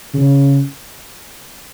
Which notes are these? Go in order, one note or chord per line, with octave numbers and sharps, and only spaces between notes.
C#3